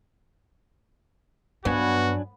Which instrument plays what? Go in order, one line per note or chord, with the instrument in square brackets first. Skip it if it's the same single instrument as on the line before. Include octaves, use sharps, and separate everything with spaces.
[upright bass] G2 [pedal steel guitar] F#3 D4 G#5 [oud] B3 [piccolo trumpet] F#4